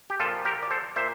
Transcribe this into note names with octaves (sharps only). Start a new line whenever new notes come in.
G4
A#2 F3 F4 A4
G4 A#4
D5
A4 C5
A#2 C5 E5